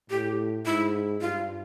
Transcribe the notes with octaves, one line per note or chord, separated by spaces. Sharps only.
A2 G4
G#2 E4
G2 F4